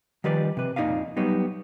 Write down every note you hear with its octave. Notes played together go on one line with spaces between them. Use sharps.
D#3 F3 G3 B4 D5
C3 B4
F2 A#2 D#4 D5 D#5 F5
F#3 G3 B3 D#4